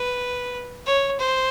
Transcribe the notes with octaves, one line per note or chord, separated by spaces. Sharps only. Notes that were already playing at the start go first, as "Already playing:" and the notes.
Already playing: B4
C#5
C5